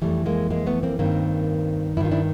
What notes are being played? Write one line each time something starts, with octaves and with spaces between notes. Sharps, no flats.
F2 C#3 E3 G3 A3
G#3 A#3
G#3 A#3
A3 B3
A#3 C4
G2 D#3 A#3 C4
G2 D#3 E4 F4
D4 E4